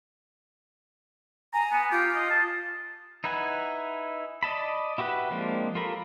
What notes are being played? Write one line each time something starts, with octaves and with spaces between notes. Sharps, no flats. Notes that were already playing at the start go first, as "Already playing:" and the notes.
G#5 A#5
B3
F4 G4
D#5
A5
D#4 E4 B4 F#5 G#5
D5 D#5 A5 B5
E4 F#4 G4 B4 F#5
F3 G#3 A#3 C4 D4
F4 G4 A4 A#4 B5